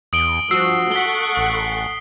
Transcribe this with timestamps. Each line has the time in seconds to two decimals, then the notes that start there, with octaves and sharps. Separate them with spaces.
0.13 E2 D#6 D7 G7
0.51 G2 F3 F#4 E6 C7
0.92 A4 F#5 C#6 B6 G7
1.37 A1